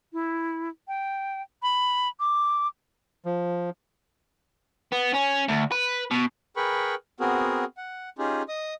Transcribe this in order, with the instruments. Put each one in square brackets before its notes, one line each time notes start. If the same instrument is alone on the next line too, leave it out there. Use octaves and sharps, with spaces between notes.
[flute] E4
G5
B5
D6
[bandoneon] F3
[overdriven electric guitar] B3
C#4
D2
B4
B2
[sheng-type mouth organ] G#4 A#4 B4 G5 B5 C#6
B3 C4 F#4 G#4 A#4
F#5
C#4 D#4 F4 G4 G#4
D#5 D#6